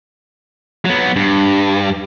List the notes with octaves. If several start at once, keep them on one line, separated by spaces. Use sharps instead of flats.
F#3 B3
G2